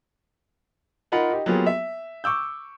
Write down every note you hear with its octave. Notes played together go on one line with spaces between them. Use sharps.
D#4 F4 A#4 F#5 B5
D#4 G4
F#3 A#3 B3 F4 G4 G#4
E5
C#6 D6 E6 G6